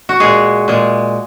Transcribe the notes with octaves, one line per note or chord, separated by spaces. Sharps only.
F#4
A#2 G#3 G#4
A#2 G#3